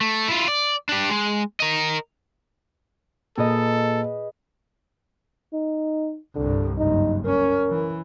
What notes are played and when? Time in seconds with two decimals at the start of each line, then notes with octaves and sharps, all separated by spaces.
0.01 A3
0.28 E4 F4
0.48 D5
0.89 D4 G4
1.10 G#3
1.60 A#4 D#5
3.38 A#2 G#4 A4 B4 D#5
5.53 D#4
6.35 C2 G2 D3
6.78 F#1 G2 D#4
7.25 C#4 A#4
7.69 E3